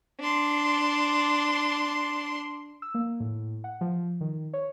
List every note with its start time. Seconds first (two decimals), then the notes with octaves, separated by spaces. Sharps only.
0.19 D4 C6
2.82 E6
2.94 A#3
3.20 A2
3.64 F#5
3.81 F3
4.21 D#3
4.54 C#5